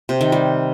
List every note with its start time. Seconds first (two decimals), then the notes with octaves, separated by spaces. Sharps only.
0.09 C3
0.21 D#3
0.32 G3